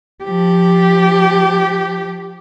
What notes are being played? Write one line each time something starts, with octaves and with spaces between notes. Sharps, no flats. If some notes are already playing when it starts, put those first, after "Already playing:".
F3 G4